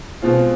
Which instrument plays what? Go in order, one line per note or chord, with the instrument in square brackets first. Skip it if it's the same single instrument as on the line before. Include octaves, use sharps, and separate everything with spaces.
[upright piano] B2 G#3 C4 F4